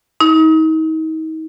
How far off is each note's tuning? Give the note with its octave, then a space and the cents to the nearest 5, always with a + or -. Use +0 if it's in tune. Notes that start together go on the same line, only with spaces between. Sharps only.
D#4 +35